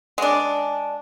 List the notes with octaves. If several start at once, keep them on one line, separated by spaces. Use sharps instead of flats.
G#3 D4